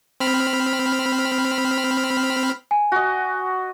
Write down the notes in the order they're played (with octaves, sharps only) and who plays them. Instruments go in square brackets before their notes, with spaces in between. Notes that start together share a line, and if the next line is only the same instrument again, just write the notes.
[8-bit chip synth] C4 B5 F6
[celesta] G#5
[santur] F#4 D#5